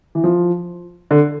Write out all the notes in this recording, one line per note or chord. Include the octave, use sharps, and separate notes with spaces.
E3
F3
D3